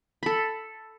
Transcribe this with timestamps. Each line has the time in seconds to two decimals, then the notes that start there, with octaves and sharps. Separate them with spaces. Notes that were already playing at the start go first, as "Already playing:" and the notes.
0.23 A4 B5